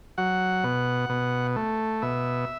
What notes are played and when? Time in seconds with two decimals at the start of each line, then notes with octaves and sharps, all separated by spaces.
0.18 F#3 F#5
0.64 B2
1.10 B2
1.56 A3
2.02 B2 E5